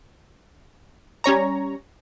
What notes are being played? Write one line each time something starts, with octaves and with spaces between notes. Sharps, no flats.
G3 C#4 C#5 A#5